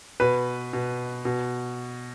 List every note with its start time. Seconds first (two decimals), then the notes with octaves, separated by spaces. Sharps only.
0.20 B2 B4
0.73 B2
1.25 B2